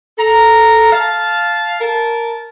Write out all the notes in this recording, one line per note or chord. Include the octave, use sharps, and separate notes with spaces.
A4 A#5
F5 A5
A#4 A5